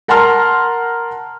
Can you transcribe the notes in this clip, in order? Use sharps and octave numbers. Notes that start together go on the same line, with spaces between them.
A#4 F#5 A5 A#5 C6 F6